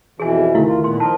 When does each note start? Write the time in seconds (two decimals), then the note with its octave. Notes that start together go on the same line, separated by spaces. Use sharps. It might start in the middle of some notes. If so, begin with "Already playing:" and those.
0.20 F2 B2 E3 G#4 G#5
0.55 D#3 A3 E4 F5
0.67 D2 F4
0.84 A#2 B3 C6
1.00 F3 A#4 D#5 A5